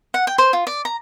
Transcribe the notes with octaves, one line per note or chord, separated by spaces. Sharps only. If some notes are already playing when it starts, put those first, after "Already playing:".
F#5
G5
C5
F4
D5
A#5